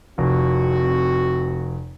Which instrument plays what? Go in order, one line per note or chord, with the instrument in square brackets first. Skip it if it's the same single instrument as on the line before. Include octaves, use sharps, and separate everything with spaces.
[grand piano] F1 [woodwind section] C4 F#4